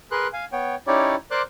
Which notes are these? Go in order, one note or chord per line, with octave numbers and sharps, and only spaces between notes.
G#4 A#4 B4 C6 F#6
F5 G#5
B3 C#5 G5
C#4 D#4 E4 G4 C#5 D5
A#4 C5 D5 C6 D6 F#6